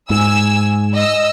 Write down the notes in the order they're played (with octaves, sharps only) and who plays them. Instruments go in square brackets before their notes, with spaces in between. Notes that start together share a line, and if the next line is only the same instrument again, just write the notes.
[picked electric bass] G#2 [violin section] G#5 E6
[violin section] D#5 E6